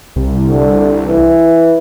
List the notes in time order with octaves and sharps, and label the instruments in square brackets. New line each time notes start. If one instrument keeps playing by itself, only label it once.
[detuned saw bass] C2
[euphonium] D3
E3